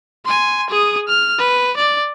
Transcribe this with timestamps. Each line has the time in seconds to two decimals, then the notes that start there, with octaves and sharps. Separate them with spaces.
0.25 G#5 C6
0.70 G#4 D#6
1.08 F6
1.39 B4
1.77 D5